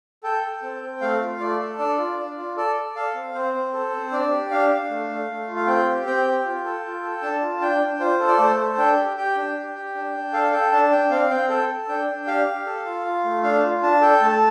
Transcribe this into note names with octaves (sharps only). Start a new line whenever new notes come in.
A4 G5
A4
C4
C4
A3 F5
F4
A3 D5
A4
D4 D5
F4
D4
F4
A4 D5
A4
A4 F5
C4
C4 C5
C4
A4
C4
D4 D5
G4
D4 F5
D4
A3
A3
A3
F4
F5
C4 G5
G4
C4 G5
G4
F4
A4
F4
A4
D4 A5
F4
D4 G5
D4
F4 C5
A4
D5
A3 C5
A4
D4 G5
G4
G4 G5
D4
G4
G4
D4
D4
A4 F5
A4 G5
D4 A5
D4 G5
C4 F5
C4 G5
A4 G5
A4
D4 G5
D4
G4 F5
G4
A4
F4
F4
A3
D4 F5
F4
D4 A5
A4 G5
A3 A5